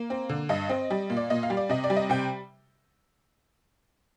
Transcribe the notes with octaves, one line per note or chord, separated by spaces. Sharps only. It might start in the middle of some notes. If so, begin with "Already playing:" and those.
Already playing: A#3
C4
D3
G2 D#5
C4
G3
A#2
D5
A#2 D#5
F5
G3
D5
C3 D#5
D5
G3
D#5
C3 G5